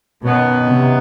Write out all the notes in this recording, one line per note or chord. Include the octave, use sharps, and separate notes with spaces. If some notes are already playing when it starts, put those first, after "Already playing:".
F#2 B2 D#3 F#3 B3
C3